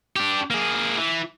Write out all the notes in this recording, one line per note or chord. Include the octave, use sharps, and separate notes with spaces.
D4 G4
A#3 G#4
E3